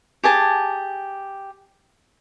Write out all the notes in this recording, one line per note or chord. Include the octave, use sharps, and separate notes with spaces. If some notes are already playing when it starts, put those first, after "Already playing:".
G4 G#4 G#5 A5